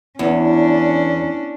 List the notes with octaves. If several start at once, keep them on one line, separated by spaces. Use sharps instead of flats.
E2 C#4 D4